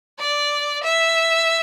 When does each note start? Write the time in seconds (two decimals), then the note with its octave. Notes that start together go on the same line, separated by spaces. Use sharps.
0.19 D5
0.84 E5